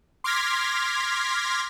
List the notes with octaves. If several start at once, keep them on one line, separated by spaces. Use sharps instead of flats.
C6 D6 F6 G#6 A#6 B6